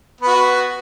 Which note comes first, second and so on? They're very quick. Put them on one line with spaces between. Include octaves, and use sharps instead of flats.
B3 B4 F#4